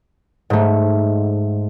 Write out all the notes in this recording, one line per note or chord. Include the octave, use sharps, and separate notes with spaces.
G#2 A3